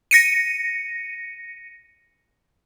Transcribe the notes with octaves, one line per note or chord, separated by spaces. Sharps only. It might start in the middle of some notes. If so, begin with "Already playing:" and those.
A#6 C#7 D#7